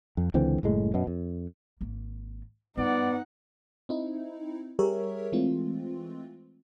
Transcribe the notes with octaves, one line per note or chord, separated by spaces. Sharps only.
F2
C#2 D3 E3 C4
F#1 A2 G#3
F#2 B2
F2
G#1 A#3
G2 B3 D#4 D5 F#5
C4 D#4 E4
G3 G4 G#4 A#4 C#5 E5
E3 G#3 A3 C4 F4